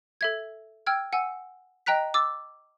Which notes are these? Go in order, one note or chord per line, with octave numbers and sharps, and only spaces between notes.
A4 E5 G#6
G5 E6 F6 G#6
F#5 G#5 E6
D#5 G5 A#5 F#6 B6
D6 E6 A6